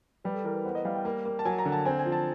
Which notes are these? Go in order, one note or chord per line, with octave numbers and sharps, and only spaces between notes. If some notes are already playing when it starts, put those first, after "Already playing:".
G3 B4
A4
E3 A#4
B4
B3 C5
D#5
G3 F5
G5
A#3
A#3
A5
F#3 G#5
A#5
D3
A5
C4 G#5
G#5
F3
A5